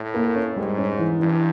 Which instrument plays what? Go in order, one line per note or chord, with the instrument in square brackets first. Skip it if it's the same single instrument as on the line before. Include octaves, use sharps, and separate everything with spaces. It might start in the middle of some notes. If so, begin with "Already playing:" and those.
Already playing: [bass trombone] A2
[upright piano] A#3
C#4
[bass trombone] G#2 [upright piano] G3
[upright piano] C#4
E3
[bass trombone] G2 [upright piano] E3